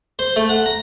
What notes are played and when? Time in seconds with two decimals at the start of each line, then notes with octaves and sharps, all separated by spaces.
0.19 C5
0.36 A3
0.49 F#5
0.66 A#5